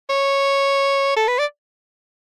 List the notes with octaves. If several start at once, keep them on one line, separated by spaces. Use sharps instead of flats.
C#5
A4
B4
D5